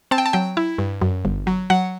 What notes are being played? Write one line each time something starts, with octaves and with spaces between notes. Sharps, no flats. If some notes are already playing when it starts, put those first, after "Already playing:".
C4 A5
G5
A5
F#3 G5
E4
G2
F#2
G1
F#3
F#3 F#5